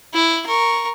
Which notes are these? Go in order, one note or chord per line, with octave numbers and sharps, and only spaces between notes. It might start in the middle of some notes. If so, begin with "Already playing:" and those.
E4
A#4 C#6